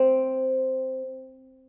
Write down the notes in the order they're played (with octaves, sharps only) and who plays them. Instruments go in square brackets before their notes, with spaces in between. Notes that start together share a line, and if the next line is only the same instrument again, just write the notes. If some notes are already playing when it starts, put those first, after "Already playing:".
Already playing: [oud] C4